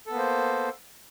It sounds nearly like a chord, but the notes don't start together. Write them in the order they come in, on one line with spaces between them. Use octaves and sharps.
A4 B3 A#3 C5